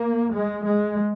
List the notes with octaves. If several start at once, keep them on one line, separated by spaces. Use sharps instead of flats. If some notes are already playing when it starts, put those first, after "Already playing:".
Already playing: A#3
G#3
G#3